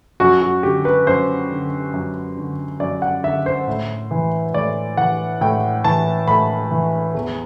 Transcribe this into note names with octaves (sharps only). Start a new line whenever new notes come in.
F#2 F#4
F#4
D3 G4
B4
F#2 C5
D3
F#2
D3
F#2 D5
F#5
D3 E5
C5
A2
E3
A2 D5
E3 F#5
A2 G5
E3 A5
A2 B5
E3
E2